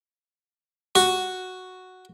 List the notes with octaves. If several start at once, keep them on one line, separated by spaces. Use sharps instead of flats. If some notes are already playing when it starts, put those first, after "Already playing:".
F#4